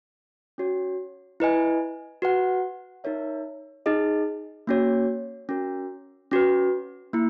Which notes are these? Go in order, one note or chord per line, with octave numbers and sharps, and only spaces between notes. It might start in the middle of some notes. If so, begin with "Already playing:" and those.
C#4 F#4 C#5
E4 B4 D#5 G#5
F#4 B4 F#5
D#4 A#4 C#5 E5
D#4 G#4 D#5
A#3 C#4 F#4 C#5
C#4 F#4 A#4
C#4 F#4 B4
A#3 E4